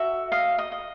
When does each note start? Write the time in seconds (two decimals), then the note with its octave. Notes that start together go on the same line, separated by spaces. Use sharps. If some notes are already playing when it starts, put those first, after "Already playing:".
Already playing: F#4 A4 E5
0.32 D#5 F5
0.58 D#5
0.72 D#5